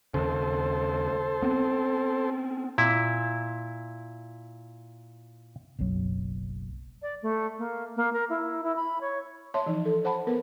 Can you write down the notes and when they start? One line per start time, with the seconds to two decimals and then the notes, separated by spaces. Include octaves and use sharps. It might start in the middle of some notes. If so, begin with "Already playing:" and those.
0.14 D#2 C#3 A4 C5
1.42 B3 C4
2.78 A#2 E4
5.79 F#1 B1 F#2 F#3
7.02 D5
7.22 A3
7.58 A#3
7.96 A#3
8.13 A#4
8.30 E4
8.63 E4
8.76 B5
9.01 C#5
9.54 C#5 E5 A5 C6
9.66 E3 F3 D#4
9.85 A4
10.05 C5 F#5 A5 B5
10.27 B3 A#4 B4